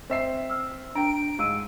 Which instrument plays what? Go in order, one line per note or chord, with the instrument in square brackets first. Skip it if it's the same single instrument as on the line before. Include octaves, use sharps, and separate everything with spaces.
[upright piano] C4 E5 C7
[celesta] E6 F6
[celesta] D4 [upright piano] G5 A#5 [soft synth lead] D7
[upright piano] G#2 [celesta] F5 E6 D#7